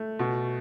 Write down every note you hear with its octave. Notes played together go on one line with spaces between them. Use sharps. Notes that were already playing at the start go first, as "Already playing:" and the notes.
Already playing: A3
B2